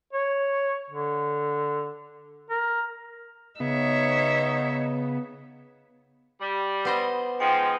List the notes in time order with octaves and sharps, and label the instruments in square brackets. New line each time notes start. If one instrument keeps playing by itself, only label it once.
[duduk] C#5
D3
A#4
[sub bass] C#3 [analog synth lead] B3 [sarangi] D#4 [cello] C#5 E5
[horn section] G3
[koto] B3 C5 D#5
[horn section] F3 G#3 D#4 [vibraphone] G5